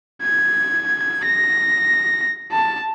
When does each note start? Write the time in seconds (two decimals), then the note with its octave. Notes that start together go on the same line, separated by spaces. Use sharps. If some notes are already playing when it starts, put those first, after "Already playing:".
0.22 G#6
1.25 A#6
2.52 A5